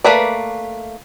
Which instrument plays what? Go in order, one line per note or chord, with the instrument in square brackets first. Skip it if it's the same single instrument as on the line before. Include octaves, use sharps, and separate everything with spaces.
[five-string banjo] A3 A#3 B4 D5